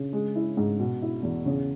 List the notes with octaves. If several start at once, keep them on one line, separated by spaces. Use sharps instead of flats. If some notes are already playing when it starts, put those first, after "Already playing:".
Already playing: C#3
G#3
E4
G#2
B2
E4
E2
C#3